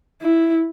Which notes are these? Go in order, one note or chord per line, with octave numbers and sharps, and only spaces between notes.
E4